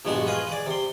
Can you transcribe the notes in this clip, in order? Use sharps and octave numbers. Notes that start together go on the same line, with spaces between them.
A#1 G2 G#3 B3 F#4 C#6
F4 G#4 B4 D#5
G#4 D5
C3 C6